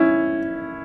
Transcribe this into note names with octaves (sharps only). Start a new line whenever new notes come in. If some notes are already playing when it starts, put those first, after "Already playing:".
Already playing: C#4 E4